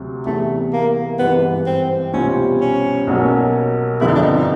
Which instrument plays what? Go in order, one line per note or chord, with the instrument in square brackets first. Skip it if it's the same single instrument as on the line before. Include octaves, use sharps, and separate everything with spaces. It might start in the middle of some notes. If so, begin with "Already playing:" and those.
Already playing: [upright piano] D2 C3 F#3
[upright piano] E2 C3 E3 [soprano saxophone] A3
[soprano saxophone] A#3
[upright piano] G#1 G2 E3 [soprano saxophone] B3
[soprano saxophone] C4
[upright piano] C2 B2 G3 C4 F4 [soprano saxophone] C#4
[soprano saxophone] C#4
[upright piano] B1 B2 F#3 A#3 C#4
[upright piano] G1 F2 D3 F3 [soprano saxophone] E4
[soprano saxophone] D#4
D4
D#4
D#4